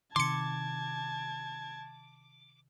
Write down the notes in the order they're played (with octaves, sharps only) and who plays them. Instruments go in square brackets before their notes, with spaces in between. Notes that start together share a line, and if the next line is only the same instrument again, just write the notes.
[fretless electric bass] C3 D#3 [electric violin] A5 G#6 [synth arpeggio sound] C6 C#7 [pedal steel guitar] D6